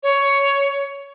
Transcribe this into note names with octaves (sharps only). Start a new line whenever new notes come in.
C#5